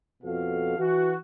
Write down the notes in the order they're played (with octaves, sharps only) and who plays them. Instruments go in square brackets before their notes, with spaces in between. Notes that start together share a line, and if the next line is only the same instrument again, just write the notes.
[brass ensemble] F2 B2 F4 F#4 A4 F5
E3 F#4